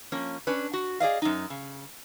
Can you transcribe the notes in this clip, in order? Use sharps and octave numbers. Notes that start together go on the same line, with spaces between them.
F3 A#3 C#4
C#4 D4 B4
F#4
G#4 D5 D#5 F5
F#2 D#4
C#3